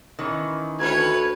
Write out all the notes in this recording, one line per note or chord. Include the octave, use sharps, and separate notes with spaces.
D#3 E3 C#4
D2 B4 C#5 G#6